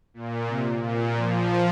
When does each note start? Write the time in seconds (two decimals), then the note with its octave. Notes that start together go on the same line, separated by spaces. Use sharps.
0.14 A#2
0.48 C3
0.83 A#2
1.17 F3